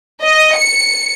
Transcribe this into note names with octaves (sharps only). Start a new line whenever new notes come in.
D#5
C#7